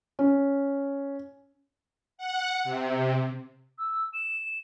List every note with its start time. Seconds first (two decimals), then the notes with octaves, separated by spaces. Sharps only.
0.19 C#4
2.18 F#5
2.64 C3
3.78 E6
4.13 E7